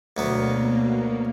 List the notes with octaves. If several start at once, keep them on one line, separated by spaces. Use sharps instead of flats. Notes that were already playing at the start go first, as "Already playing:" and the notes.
D2 B2 F#3 A#3 B3